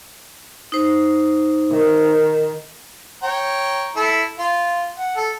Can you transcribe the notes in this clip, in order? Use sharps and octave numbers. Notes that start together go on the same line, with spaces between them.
D#4 C5
D#3
C#5 G5 A#5
E4 A4
F4
F#5
A4